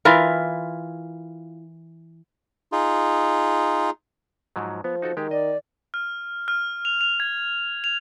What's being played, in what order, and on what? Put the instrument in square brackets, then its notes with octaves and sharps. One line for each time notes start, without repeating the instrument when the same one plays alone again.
[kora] E3 E4 F4 A#4
[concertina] D#4 F4 G#4
[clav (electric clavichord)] G#2 F3 F#3
[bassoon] F3 [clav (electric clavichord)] B3
[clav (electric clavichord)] D#4 F#4 A4
[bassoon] D#3 [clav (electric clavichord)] G#3 G4
[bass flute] D5 [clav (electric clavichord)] D#5
[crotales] F6
F6
F7
F7
G#6
F7